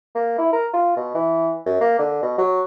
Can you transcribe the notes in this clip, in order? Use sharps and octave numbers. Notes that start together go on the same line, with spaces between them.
A#3
E4
A#4
F4
B2
E3
F#2
A#3
D3
B2
F#3